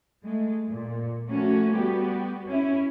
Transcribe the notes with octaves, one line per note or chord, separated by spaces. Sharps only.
G#3 A3
A#2
F3 A3 A#3 C#4 F#4
G3 B3 F#4 G4
C#4 E4